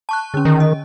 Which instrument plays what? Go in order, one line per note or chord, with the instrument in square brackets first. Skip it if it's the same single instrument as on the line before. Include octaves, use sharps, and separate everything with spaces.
[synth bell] A5 C#6 F#6
D3 C#4
[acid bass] D#3
[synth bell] D#5